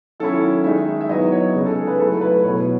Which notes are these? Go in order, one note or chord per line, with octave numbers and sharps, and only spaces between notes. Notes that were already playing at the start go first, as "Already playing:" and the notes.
D#3 F#3 C#4 E4 A4
D#3 G#3 D#4 E5
E5
F#3 B3 E4 D#5
C#5
C#3 G#3 D#4
A4
G#4
B4
F#3 A3 E4 A4
B4
B2 F#3 B3 E4 C#5